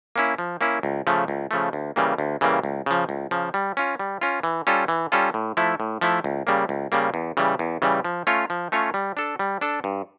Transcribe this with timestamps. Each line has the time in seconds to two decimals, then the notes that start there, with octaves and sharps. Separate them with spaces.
0.16 A#3 C#4 E4
0.38 F3
0.61 A#3 C#4 E4
0.83 C#2
1.07 C#3 F3 A3
1.28 C#2
1.51 C#3 F3 A3
1.73 D2
1.96 C#3 E3 G3 A#3
2.18 D2
2.41 C#3 E3 G3 A#3
2.63 C#2
2.86 C#3 F3
3.09 C#2
3.31 C#3 F3
3.54 G3
3.77 C#4 F4
3.99 G3
4.21 C#4 F4
4.43 E3
4.67 G3 C#4 F4 A4
4.88 E3
5.12 G3 C#4 F4 A4
5.34 A2
5.57 F3 A3 E4
5.80 A2
6.01 F3 A3 E4
6.24 C#2
6.47 C#3 G3 A#3
6.69 C#2
6.92 C#3 G3 A#3
7.14 E2
7.37 C#3 E3 G3
7.59 E2
7.82 C#3 E3 G3
8.05 F3
8.27 A3 C#4 F4 C#5
8.50 F3
8.72 A3 C#4 F4 C#5
8.94 G3
9.17 D4 A4
9.39 G3
9.61 D4 A4
9.84 G2